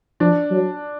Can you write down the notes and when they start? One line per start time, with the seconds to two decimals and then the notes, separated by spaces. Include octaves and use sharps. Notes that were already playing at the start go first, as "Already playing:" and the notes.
0.20 F3 D4
0.51 F#3